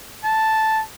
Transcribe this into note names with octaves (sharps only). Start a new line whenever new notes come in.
A5